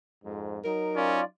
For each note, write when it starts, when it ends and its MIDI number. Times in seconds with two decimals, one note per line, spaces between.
0.25 0.58 41
0.25 0.58 44
0.64 1.22 54
0.64 1.22 63
0.64 1.16 70
0.96 1.21 61
0.96 1.25 65
0.96 1.25 74